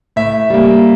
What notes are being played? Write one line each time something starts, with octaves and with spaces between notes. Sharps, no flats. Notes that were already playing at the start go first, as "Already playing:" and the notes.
A2 E5
G3 A#3